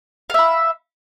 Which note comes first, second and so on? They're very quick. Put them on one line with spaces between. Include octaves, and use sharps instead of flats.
F5 E5 B5